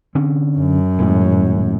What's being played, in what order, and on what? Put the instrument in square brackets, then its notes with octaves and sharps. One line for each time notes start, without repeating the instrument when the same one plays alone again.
[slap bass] D3 C4 C#4
[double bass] F#2
[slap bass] D#1 A2 G#3